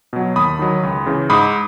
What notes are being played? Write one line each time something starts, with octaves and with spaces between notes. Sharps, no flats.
B2 F#3
D#2 B5 D#6
D#3 F#3
C#2
C#3 E3
G#2 B5 D#6